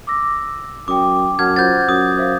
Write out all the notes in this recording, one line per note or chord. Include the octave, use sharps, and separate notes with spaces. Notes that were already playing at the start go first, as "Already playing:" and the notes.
D6 E6 A#6
F#2 G5 D6 D#6
F#2 F#5 A5 F6 G#6
F4 C5 F#5 G6 A6
F#2 D#6
C5 E5 F5